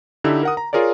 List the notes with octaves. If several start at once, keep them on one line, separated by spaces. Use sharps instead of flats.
D3 D#4 E4 G4 E6
A#4 F#5 D#6
A#5
F4 G#4 A#4 C#5 D5